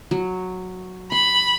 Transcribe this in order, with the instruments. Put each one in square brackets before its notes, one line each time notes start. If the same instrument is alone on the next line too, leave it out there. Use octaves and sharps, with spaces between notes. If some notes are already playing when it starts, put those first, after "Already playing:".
[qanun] F#3
[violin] B5 [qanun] C6